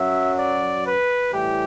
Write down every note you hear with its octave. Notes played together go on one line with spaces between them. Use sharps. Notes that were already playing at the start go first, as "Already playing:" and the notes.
Already playing: F#2 F#3 E5
D5
B4
A2 E3 G3 G4